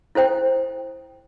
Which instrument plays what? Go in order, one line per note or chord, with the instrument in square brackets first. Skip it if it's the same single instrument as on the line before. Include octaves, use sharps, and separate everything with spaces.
[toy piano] E4 A4 C5 G5